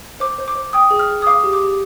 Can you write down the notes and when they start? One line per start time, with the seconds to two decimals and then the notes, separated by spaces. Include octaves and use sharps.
0.20 C5 D6
0.38 C5
0.48 D6
0.55 C5
0.73 G5 D#6
0.91 G#4
0.99 F6
1.09 G#4
1.22 D#6
1.27 F5 D6
1.43 G4
1.53 D6
1.62 G4